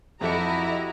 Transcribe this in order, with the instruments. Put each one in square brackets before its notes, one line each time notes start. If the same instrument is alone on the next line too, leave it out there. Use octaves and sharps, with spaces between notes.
[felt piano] F2 A4 C#7 [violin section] E4 A#5 [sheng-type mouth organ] F#4 G4 [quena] D#5